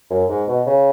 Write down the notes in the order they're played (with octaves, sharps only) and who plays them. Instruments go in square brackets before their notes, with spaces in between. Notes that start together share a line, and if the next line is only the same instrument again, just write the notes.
[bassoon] F#2
G#2
B2
C#3